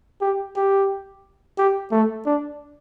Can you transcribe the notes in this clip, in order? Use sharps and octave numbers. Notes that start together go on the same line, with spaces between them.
G4
G4
G4
A3
D4